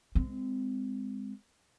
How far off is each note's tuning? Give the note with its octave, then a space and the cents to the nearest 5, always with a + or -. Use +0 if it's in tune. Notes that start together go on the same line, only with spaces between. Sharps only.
G#3 -15 C4 -25